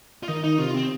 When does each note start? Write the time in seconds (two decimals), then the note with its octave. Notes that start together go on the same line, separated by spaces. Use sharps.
0.23 F4
0.28 D#3 D#4
0.44 D#4
0.58 C3 F4
0.74 C4